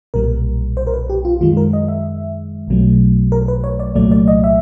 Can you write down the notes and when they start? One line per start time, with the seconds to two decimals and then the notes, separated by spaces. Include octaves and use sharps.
0.14 B1 A#2 G3 A#4
0.77 C5
0.87 A#4
0.94 B4
1.10 G4
1.25 F4
1.41 F#2 D#3 G#3 F4
1.57 A#4
1.73 D#5
1.88 E5
2.68 B1 B2 F#3 A3
3.32 A#4
3.48 B4
3.64 C#5
3.80 D5
3.95 C2 A#2 F#3 A3 D5
4.11 D5
4.28 D#5
4.44 E5